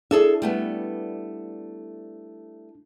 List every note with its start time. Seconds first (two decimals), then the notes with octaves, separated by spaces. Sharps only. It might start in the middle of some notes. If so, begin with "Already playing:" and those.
0.11 D4 E4 G#4 A4 E5
0.42 G3 A3 B3